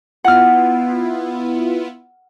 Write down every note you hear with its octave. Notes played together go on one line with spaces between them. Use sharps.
B3 E4 F4 F#5 F6